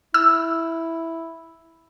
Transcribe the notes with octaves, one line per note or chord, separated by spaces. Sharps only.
E4 E6